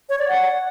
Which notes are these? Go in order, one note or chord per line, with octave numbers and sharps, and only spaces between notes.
C#5
D5
F#5